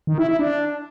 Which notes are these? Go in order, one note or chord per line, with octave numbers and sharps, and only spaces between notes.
D#3
E4
E4
D4